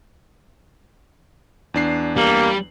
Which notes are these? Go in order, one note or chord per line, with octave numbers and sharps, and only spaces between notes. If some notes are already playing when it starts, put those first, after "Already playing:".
E2 D4 C7
G3 A#3